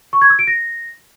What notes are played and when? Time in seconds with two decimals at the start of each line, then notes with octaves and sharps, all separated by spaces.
0.13 C#6
0.22 G#6
0.30 E6
0.39 D7
0.47 A#6